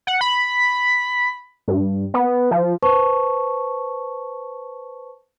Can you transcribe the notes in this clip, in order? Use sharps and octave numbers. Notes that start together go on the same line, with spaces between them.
F#5
B5
G2
B3
F3
B4 C5 A5 C#6